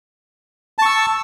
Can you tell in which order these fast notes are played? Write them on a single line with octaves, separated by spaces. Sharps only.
A5 C#6 E6